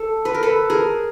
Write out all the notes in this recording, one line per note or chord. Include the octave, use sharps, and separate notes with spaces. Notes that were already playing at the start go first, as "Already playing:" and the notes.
Already playing: A4
B4
A#4
A4 B4
G#4 A#4